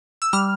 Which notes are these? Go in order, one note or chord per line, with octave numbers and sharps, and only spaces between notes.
E6
G3 F6